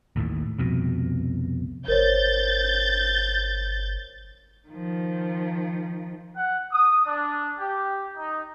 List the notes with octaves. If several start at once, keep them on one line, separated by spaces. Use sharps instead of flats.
A1 D#2 A2
C2 F2 B2
G1 A#4 C5 C#5 G6 A6
D#3 F3
F#5
D#6
D4
G4
D#4